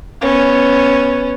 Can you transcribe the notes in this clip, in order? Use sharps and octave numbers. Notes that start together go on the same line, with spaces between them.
B3 C#4